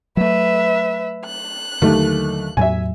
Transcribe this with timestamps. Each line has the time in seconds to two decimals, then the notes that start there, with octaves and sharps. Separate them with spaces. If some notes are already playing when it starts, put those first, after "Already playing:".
0.17 F#3 A3 B4 E5
1.26 F#6
1.82 D#2 D3 F#3 A3
2.57 E2 A2 F#3 E5 G#5